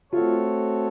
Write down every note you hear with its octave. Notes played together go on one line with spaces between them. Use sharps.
A3 C4 F4 F#4 A4 C#5